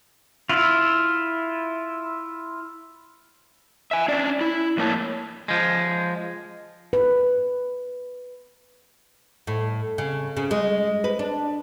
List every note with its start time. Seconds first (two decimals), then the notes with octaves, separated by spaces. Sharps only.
0.49 E4 F4
3.91 E5 G#5
4.08 C#4 D4 D5
4.41 E4
4.77 F2 A2 A#3 C#5 A5
5.48 F3 G#3
6.93 B4
9.47 A2
9.98 C#3
10.37 C#3
10.51 G#3
11.04 B4
11.19 D4